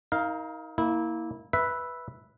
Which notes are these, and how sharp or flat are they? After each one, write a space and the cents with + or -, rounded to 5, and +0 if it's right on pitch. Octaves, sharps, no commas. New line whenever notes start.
D#4 +35 A#4 +0 F5 +0
A#3 +0 E4 -20
B4 -5 E5 +0